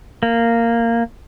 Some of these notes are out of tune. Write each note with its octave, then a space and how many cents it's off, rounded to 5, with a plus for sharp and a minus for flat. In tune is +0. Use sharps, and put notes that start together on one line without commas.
A#3 -10